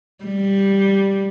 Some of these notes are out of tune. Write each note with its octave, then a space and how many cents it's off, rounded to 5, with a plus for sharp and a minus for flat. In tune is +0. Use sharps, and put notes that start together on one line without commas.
G3 +0